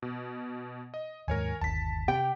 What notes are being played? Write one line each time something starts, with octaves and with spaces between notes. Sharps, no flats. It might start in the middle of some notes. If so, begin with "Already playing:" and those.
B2
D#5
D#2 G#2 A#4 C#5 G#5
G1 D#2 A5 B6
C3 G4 G5